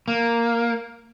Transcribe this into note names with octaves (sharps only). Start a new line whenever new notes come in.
A#3